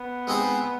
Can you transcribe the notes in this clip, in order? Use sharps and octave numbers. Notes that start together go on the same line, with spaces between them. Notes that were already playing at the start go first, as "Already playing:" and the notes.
Already playing: B3
G#3 C4 D#4 G#4 C5